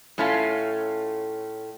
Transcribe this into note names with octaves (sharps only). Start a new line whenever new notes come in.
A2 A3 C#4 F4 A4 F5